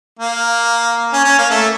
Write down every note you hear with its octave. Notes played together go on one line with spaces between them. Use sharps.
A#3
C#4
C#4
A#3
A3